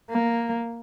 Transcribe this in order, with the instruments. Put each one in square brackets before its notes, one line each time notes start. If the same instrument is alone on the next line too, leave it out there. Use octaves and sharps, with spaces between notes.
[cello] A#3